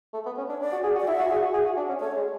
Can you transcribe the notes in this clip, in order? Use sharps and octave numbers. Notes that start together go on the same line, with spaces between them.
A3
B3
C#4
D4 C#5
D4 D5
F#4
G#4
F#4
D5
E4 E5
F#4
G#4
F#4
G#4
F#4
D4
C#4
A3 C#5
G#3